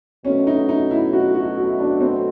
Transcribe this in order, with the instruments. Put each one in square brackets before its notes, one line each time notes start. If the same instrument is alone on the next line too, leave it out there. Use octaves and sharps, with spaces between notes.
[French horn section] B2 F#3 A3 [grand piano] C#4
[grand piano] D#4
D#4
E4
F#4
F#4
F#4
D4
C4